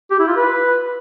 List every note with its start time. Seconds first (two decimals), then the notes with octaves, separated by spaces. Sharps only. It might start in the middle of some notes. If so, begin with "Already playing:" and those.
0.11 G4
0.19 E4
0.28 F4
0.36 B4